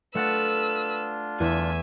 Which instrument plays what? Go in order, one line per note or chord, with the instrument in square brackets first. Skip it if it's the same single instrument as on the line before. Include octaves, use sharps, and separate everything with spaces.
[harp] A3 F#5 A6 [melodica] D4 F4 [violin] B4 E6
[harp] E2 [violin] E5 G#5